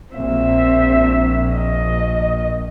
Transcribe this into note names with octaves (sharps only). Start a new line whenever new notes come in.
A#1 A#2 C4 E5
D#5